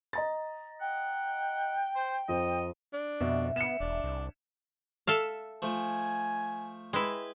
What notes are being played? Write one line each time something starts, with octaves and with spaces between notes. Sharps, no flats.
D#5 A#5 A6
F#5 G5
C5
F2 D#5
D4
F2 B2 E5
B3 C#7 E7
E1 D4
C2
A4 E5 F5
F3 A3 G#5
G#3 E4 B4 G5